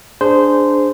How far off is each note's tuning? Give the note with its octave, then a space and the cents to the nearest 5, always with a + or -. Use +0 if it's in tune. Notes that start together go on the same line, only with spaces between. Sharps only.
D4 +0 G#4 +0 C5 -15